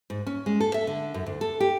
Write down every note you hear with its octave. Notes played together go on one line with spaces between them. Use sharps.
G#2
C#4
G#3
A4
E5
D3
F#2
D2
A4
G4